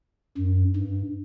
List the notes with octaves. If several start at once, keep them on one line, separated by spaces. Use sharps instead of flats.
F#2
G2